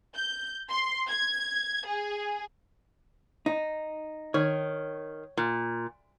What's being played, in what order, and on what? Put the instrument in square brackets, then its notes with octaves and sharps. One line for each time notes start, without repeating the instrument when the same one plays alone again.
[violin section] G6
C6
G#6
G#4
[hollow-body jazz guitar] D#4
[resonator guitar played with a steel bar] D#3 [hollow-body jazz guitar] C#5
[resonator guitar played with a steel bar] A#2